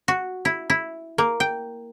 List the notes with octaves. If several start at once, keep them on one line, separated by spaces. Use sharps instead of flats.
F#4
E4
E4
A#3
G5